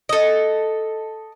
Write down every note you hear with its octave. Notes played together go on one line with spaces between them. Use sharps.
A4 D#5